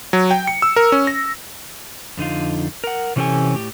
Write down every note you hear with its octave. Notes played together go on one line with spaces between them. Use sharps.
F#3
G5
C#7
E6
A#4
C#4
A#6
F2 D3 D#4 F4
A#4 F#5
C3 E3 C#4 G4 A4 G#5
A2 G4